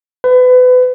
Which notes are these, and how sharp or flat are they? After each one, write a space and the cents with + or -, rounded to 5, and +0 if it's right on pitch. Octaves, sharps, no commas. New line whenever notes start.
B4 +30